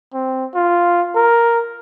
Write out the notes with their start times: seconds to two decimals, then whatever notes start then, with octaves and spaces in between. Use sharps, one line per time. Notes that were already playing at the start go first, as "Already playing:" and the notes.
0.14 C4
0.55 F4
1.16 A#4